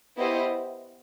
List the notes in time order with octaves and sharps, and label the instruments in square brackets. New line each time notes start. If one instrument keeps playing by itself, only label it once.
[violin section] B3 E4 G4 C5 D#5